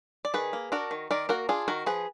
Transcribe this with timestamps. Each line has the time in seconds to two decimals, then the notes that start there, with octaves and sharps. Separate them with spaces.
0.25 D5
0.34 D#3 G#4 B4
0.53 A#3
0.72 D4 F#4 A#4
0.91 D#3
1.11 D#3 A#4 D5
1.29 A#3 F#4 A#4
1.49 D4 F4 G#4
1.68 D#3 F#4 A#4
1.86 F3 G#4 B4